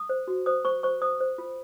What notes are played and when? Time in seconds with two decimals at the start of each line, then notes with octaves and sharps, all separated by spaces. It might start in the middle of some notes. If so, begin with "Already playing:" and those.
Already playing: D#6
0.09 C5
0.28 F#4
0.46 C5 D#6
0.65 C5 C#6
0.83 C5 C#6
1.01 C5 D#6
1.20 C5
1.38 F4